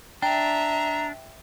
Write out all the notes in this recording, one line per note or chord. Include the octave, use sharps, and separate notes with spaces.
D4 E5 G5 A#5